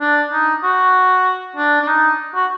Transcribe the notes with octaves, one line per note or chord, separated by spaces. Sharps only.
D4
D#4
F#4
D4
D4
D#4
F#4